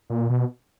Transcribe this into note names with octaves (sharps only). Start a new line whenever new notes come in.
A#2
B2